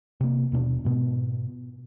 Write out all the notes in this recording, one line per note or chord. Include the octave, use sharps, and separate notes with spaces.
C3 A#3
D#1 B2 C#4 D4
G#2 B2 B3